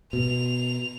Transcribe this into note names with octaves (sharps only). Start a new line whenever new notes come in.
B2 F7